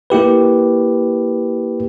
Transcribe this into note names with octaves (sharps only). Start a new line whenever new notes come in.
A#3 E4 G4 B4